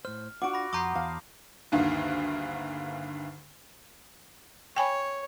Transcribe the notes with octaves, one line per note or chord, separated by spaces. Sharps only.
A2 C5 F6
D4 F4 F#4 F#5 D6 D7
B5 D6 A#6
F2 A#5 C6 D6 D#6 G6 C7
E2 F5 A5
D2 G2 D3 D#3 A#3
C#5 G5 G#5 B5